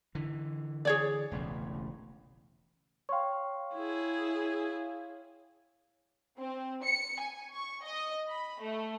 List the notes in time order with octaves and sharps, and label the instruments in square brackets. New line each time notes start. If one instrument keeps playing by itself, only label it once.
[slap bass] D3 E3
[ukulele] G#4 C#5 D5
[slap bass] E1 A1 C#3
[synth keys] C#5 F5 [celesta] G5 C6 C#6
[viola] E4 G#4
[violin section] C4
C#7
G#5
C#6
D#5
B5
A3